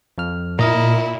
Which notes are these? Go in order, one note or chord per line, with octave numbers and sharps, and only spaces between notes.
F2 F6
A#2 E4 A#4 D#5 A#5